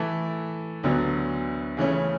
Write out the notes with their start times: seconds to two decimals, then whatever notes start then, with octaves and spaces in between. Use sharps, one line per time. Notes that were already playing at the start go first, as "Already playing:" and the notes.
Already playing: E3 A3 E4 A4
0.83 D2 D3 F#3 B3
1.77 C#3 E3 A3 C#4